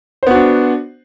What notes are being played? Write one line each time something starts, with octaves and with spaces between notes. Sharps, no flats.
B3 D4 F#4 C5